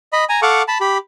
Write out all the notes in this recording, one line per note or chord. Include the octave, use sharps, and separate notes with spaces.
D#5 B5
G#5 A#5
A4 F5 F#5 C#6 D6
A5 B5
G4 B5